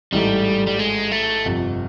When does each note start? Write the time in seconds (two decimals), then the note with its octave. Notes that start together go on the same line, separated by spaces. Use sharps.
0.12 A1 G#2 E3 G3 A3
0.67 G3
0.79 G#3
1.12 A3
1.45 G1 F2 C3 F3